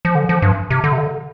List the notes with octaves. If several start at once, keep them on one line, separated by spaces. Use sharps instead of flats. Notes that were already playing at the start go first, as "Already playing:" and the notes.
F3
D3
F3
G2
C3
D3
C3
D3